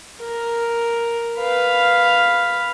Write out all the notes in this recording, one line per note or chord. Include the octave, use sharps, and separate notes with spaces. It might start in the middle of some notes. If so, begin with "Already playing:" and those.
A#4
B4 F5